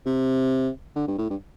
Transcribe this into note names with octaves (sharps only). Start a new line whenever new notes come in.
C3
D3
G2
A2
G2